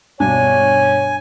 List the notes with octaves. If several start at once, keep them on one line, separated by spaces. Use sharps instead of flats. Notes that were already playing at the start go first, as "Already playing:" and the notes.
G2 B2 D4 C#5 G#5